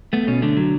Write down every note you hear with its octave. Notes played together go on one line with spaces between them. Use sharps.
A3 B3
B2 C#4
D3 A3 D4
F#3